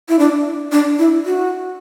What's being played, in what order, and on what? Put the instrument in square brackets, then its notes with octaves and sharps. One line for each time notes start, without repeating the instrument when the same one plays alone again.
[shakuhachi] E4
D4
D4
E4
F#4